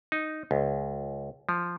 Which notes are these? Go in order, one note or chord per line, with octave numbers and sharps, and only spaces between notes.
D#4
C#2
F3